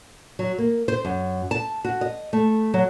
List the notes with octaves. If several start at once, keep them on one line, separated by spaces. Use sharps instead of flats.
F#3
A#3
C5
F#2
A5
F#4
D#5
A3
F#3